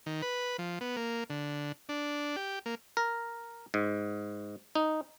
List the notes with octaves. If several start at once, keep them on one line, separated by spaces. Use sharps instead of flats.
D#3
B4
F3
B3
A#3
D3
D4
G4
A#3
A#4
G#2
D#4